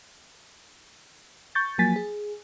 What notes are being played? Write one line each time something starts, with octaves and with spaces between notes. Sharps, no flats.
C#6 G6 A6
F3 F#3 A#3 G#5 A6 B6
G#4